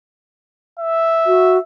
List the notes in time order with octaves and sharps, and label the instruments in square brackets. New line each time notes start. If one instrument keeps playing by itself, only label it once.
[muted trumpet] E5
[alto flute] F#4